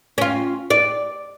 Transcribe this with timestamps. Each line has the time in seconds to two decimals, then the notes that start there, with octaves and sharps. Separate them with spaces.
0.18 C#4 F4
0.70 D5